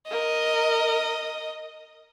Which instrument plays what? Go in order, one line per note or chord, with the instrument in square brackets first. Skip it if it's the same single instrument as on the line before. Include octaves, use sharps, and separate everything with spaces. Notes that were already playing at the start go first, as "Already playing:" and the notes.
[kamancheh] A#4 [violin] D#5